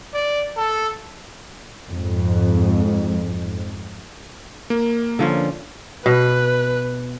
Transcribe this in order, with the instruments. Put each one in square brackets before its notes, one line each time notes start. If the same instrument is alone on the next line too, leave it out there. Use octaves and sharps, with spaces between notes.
[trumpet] D5
A4
[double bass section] F2 G#2
[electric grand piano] A#3
[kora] D3 F3 C#4
[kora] B2 [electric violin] B4